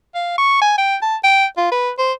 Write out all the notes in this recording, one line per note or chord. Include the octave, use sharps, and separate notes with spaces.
F5
C#6
G#5
G5
A5
G5
F4
B4
C5